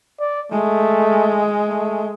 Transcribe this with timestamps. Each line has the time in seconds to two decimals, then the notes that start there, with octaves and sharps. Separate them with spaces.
0.20 D5
0.52 G#3 A3
1.68 A3